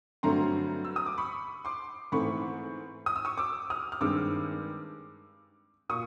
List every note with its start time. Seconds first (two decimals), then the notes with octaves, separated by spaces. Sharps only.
0.23 G2 D3 F#3 A3 C4 A#5 C6
0.85 E6
0.96 D#6
1.06 D6
1.18 B5 C#6
1.65 C6 D6
2.12 G#2 E3 A3 C4 B5 C#6
3.06 D#6
3.16 E6
3.25 C#6 D#6
3.38 D6 E6
3.70 D#6 F6
3.92 F6
4.01 G2 D#3 G#3 C4 D6 E6
5.89 A#2 C#6 D#6